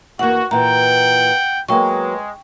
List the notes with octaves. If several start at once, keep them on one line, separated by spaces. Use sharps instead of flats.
E2 A#3 F#4 F#5
A#2 E3 F#5 G5 A#5
F#3 G#3 A#3 B3 G5 C#6